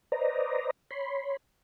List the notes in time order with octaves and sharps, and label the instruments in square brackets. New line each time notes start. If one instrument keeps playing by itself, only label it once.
[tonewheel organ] B4 C5 D5 D#5 A#5
C#5 B5 C6